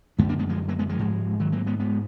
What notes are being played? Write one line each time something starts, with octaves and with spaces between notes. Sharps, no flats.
F#2 D3 G#3 B3
A#3 D4
G#3 B3
F3 G#3
F#3 A#3
G#3 B3
F3 G#3
G#2
D#3 F#3
F#3 A#3
G#3 B3
G#2 G#3 B3